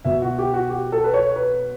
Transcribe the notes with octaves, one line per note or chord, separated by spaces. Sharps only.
B2 E5
F#4
G4
F#4
G4
A4
B4
C#5
B4